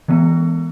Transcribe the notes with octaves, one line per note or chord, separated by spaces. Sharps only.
E3 G#3 B3